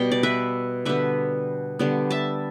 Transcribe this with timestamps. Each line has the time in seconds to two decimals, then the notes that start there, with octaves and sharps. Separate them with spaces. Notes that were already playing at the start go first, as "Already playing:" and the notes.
Already playing: B2 G3 B3 G5
0.12 D5
0.23 B4 E5
0.85 D3 G3 B3 B4 E5
1.79 D3 G3 B3
2.10 E5 A5